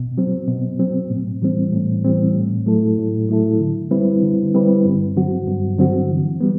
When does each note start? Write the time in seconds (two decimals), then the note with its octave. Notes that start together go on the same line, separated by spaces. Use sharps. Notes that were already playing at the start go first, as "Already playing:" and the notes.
Already playing: B2
0.18 F#3 C4
0.48 B2
0.79 F#3 C4
1.11 A2
1.42 E3 G3 C4
1.73 A2
2.05 E3 G3 C4
2.35 A2
2.66 F#3 A3 E4 A4
2.98 A2
3.29 F#3 A3 E4 A4
3.60 D3
3.91 G3 C4 E4 B4
4.22 D3
4.54 G3 C4 E4 B4
4.85 G2
5.17 D3 F#3 C4 F#4
5.47 G2
5.78 D3 F#3 C4 F#4
6.10 E3
6.41 G3 B3